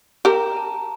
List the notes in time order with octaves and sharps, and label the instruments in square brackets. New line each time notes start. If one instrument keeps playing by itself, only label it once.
[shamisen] G4 A#4 [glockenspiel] A#5
[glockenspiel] A5